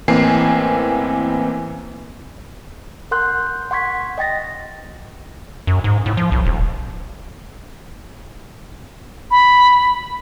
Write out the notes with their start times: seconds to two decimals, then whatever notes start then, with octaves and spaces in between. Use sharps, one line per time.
0.08 A1 E3 A#3 C4 G#5 C7
3.11 A#4 F#5 C6 F#6 G6
3.71 F#5 C6 C#6 G#6 B6
4.18 D#5 G5 A6 A#6
5.67 F#2
5.84 G#2
6.06 A2
6.17 F3
6.32 B1
6.45 D#1
9.31 B5